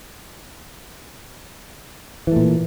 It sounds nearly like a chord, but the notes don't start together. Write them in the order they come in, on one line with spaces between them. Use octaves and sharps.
E3 A3 A#2